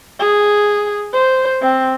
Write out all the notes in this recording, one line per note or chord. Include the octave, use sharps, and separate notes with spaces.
G#4
C5
C4